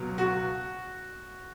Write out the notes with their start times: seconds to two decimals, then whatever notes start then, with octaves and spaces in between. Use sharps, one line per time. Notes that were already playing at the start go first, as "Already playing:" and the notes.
Already playing: C#2 B2 F#3
0.18 F#4